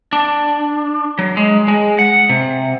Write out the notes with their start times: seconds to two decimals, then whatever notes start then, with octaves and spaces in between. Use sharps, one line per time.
0.13 D4
1.19 F#3
1.37 G#3
1.68 G#3
1.99 F#5
2.29 C3